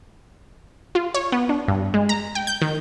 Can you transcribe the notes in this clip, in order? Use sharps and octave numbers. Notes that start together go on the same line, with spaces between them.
F4
C#5
B3
D4
G2
G#3
A#5
G5
G6
D#3